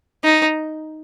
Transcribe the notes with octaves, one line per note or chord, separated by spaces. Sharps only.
D#4